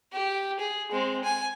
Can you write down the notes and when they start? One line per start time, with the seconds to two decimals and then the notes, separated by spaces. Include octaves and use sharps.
0.12 G4
0.59 G#4
0.91 G#3 C4
1.24 G#5